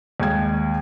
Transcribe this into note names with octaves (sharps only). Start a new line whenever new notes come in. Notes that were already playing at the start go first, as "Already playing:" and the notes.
D#2 G#3 G#6